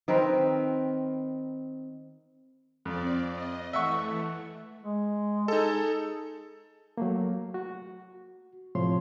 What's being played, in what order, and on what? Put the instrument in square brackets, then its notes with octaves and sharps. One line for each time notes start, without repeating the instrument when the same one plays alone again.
[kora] D#3 C4 A#4 B4
[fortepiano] F2 [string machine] C4 D5
[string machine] D#5
[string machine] E3 A3 [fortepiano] E5 F#5 C#6
[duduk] G#3
[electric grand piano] D#4 A4 [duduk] G#4
[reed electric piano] F#3 A3 A#3
F#4
A2 C3 F3 C#5 C6